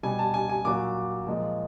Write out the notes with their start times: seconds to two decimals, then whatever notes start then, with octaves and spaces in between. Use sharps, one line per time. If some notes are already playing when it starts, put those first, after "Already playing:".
0.03 B2 G3 G#5
0.19 A5
0.34 G#5
0.49 G#5
0.65 A#2 F#3 D6
1.27 A#2 F3 G#3